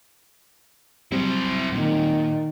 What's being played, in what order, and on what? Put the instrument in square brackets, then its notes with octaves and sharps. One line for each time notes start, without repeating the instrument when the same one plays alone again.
[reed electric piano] F#3 G3 C4 [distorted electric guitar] E4 C5
[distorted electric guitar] A#2 [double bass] D#3